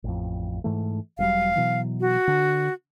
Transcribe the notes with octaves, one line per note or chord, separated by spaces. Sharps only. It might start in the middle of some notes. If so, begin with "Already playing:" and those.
A1 F2
G#2 E3 A3
E1 F#3 G3 F5
B2 E3 F#3
F#4
D3